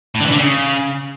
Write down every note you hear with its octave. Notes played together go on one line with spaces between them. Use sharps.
A2
D3
E3
D3
C#3